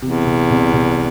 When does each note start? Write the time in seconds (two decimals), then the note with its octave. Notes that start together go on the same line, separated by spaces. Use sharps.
0.02 E2 C3
0.26 C2
0.50 C2
0.73 C2